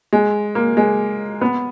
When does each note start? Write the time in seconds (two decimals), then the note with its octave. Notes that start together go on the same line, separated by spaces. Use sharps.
0.13 G#3
0.55 A#3
0.77 G#3
1.41 B3